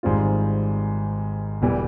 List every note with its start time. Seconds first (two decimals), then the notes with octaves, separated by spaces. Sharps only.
0.03 G#1 G#2 G3 C4 F4
1.62 E1 E2 E3 G3